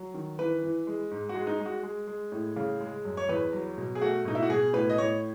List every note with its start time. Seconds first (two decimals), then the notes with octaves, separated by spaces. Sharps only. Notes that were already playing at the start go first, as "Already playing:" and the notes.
Already playing: F#3
0.14 D#3
0.39 E3 B4
0.63 E3
0.87 G#3
1.11 G#2
1.29 F#4
1.35 G#3
1.47 D#4
1.60 G#3
1.66 F#4
1.83 G#3
2.07 G#3
2.32 A2
2.56 C#3
2.81 G#3
3.05 F#2
3.17 C#5
3.29 E2 B4
3.53 F#3
3.78 B2
3.95 G#4
4.01 A3 F#4
4.25 B2 D#4
4.35 E4
4.42 F#4
4.49 B2 G#4
4.73 A2 B4
4.90 D#5
4.98 A2 C#5